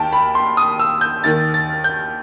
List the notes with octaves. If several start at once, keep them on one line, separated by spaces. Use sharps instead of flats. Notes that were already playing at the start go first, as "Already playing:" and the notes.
Already playing: D#2 D#3 G5 A5
B5
C6
D#6
E6
G6
D#2 D#3 A6
A6
G6